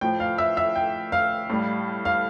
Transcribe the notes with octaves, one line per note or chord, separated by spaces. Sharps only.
A2 F3 G5
F5
E5
E5
G5
F5
A2 G3
F5